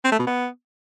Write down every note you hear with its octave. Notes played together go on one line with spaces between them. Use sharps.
C4
A3
B2
B3